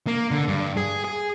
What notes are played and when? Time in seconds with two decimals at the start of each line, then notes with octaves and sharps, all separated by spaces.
0.07 A#3
0.31 D3
0.48 G2
0.77 G#4
1.04 G#4